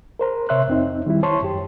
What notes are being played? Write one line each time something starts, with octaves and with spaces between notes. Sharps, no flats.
A#4 C5 A#5
C3 C#5 E5 C6 F#6
F2 C4 D#4
D#3 G3 E4
C5 C#5 A5 C6 C#6
F#2 G4